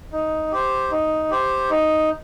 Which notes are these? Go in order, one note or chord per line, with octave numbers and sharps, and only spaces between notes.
D#4
G4 C5
D#4
G4 C5
D#4